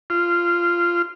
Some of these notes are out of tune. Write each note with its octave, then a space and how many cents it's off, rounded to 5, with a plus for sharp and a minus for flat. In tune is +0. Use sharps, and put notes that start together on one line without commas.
F4 -15